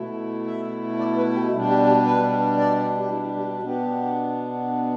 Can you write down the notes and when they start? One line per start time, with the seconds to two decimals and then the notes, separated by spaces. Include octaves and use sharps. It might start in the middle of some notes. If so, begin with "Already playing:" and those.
Already playing: B2 A3 E4
0.45 E5
0.99 D5
1.16 B4
1.34 G4
1.51 B2 G3 D4 E4
1.69 G4
1.87 G4
2.05 B4
2.57 D5
2.98 G4
3.10 E4
3.36 G4
3.63 B2 B3 D4 G4